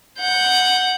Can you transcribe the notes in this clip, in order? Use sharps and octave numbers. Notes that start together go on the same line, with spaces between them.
F#5 G6